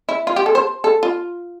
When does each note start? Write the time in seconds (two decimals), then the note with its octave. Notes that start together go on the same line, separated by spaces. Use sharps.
0.09 E4
0.27 F4
0.36 G4
0.46 A4
0.55 C5
0.84 A4
1.03 F4